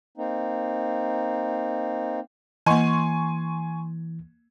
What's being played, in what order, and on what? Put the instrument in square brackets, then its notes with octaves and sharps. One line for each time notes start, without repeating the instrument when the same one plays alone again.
[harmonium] A#3 C4 D#4
[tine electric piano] E3 [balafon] A#3 D#5 [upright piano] G#5 C6 C#6